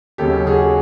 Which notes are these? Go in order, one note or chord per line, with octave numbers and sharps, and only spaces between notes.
D#2 C#3 F#3 G4 A4
F#4 G#4